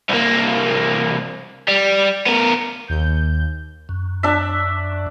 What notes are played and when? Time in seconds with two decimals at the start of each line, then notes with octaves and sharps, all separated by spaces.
0.09 C2 A#3
1.68 G3
2.26 B3 A#4
2.88 D#2 G6
3.89 F#2
4.23 D4 E5